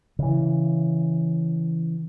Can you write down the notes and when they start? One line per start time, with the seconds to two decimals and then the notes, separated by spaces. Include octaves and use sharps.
0.19 C#3 E3